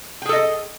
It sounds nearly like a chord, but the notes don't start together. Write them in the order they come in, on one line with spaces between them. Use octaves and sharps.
G5 G#4 A4 D#5